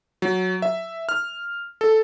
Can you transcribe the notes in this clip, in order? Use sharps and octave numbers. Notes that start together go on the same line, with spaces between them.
F#3
E5
F6
A4